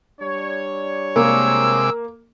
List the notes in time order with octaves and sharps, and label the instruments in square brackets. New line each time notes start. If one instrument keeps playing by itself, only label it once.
[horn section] G3 D4 C#5
[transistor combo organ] C3 G#3 D6 [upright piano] A#3 [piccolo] E6